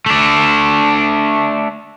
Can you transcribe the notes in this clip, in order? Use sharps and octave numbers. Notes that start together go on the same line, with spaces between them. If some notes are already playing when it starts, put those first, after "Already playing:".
A3 D4